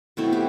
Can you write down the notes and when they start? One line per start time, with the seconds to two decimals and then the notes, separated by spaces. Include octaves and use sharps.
0.17 B2 A3 C4 E4
0.33 G4